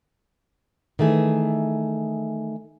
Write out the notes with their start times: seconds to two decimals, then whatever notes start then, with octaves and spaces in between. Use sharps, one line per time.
0.99 D#3 E3 A3 G#4